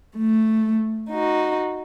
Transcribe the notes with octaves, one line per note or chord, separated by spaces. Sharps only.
A3
D#4 F#4